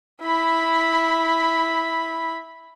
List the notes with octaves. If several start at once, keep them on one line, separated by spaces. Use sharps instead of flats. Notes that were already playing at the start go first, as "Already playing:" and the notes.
E4 B5